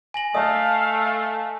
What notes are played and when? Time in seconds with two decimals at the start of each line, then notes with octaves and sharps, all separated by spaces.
0.14 G#5 A#6 F#7
0.35 A3 D#5 F5 A5 D#6